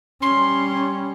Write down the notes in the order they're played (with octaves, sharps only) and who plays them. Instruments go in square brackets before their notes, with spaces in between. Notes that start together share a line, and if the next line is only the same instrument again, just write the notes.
[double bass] G3 C#4 [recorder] C6